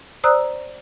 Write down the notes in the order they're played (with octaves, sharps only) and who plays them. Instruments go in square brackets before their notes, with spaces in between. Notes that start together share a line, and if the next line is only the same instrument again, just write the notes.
[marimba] C5 D5 A#5 D#6 E6 F#6